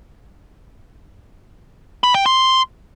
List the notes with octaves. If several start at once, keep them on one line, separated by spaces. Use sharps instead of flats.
B5
G5
C6